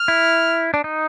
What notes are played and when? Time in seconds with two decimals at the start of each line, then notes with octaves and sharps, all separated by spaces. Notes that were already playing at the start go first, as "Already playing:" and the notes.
Already playing: F6
0.08 E4
0.74 D4
0.84 D#4